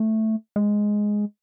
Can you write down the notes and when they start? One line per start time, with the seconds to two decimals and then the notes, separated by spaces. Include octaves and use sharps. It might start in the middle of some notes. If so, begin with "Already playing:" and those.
Already playing: A3
0.56 G#3